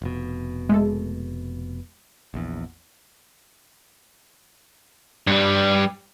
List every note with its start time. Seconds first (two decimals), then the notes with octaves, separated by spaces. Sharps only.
0.02 F1 B2
0.69 G#3 A3 A4
2.34 A#1 E2
5.27 G2 G3